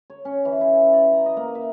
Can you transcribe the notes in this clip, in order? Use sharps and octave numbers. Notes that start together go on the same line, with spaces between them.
C#5
C#4
E3
E4
E5
D5
A#5
D#5
A#3
E5